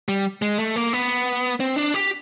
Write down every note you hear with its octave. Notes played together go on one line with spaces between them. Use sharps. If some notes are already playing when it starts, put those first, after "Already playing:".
G3
G#3
A3
A#3
B3
C4
D4
G4